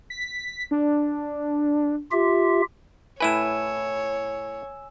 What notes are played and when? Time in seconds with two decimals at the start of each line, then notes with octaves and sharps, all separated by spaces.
0.10 B6
0.71 D4
2.11 F4 G4 E5
3.20 A2 E4 B4 C#5 G#5 E6 E7